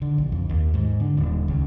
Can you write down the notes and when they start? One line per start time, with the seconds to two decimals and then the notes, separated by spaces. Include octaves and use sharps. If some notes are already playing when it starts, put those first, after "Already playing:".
0.02 D3
0.18 B1
0.32 F2
0.49 D#2
0.74 G#2
1.00 D3
1.17 D#1
1.48 C#2